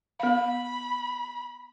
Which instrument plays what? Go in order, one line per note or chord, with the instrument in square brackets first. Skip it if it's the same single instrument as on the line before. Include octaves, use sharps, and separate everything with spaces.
[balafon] B3 F5 [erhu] B5